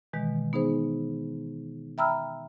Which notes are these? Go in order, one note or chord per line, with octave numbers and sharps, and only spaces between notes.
B2 D#3 E3 G#3
B3 D#4 G#4 C5
E5 G5 A#5 B5 E6 F6